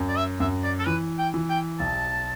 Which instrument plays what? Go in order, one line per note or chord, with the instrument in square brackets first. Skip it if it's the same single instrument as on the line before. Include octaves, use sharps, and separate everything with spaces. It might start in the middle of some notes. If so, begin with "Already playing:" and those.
Already playing: [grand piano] F#2
[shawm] D5
E5
[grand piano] F#2 [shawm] E5
[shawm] D5
A4
[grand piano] E3 [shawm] B4
[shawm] G5
[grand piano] E3
[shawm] G5
[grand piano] B1 [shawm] A5